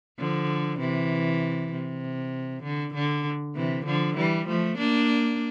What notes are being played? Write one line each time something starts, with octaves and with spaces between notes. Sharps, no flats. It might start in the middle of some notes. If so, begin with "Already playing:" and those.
D3 F3
C3 E3
C3
D3
D3
C3 E3
D3 F3
E3 G3
F3 A3
A#3 D4